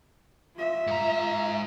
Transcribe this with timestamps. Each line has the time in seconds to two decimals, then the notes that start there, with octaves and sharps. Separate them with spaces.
0.56 F4 E5
0.87 G#2 A#5